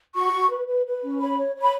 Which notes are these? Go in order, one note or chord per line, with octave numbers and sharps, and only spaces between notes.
F#4 C#6
F#4
B4
B4
B4
C#4
C#5 B5
C#5
C#5
B5